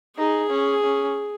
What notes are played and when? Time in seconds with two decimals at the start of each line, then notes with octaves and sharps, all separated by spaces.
0.18 D#4 G#4
0.50 C#4
0.84 C#4